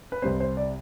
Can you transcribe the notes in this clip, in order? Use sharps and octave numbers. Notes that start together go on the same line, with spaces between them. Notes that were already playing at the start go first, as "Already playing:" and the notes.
B4
C2 C3 G3 C4 C5
C5
D5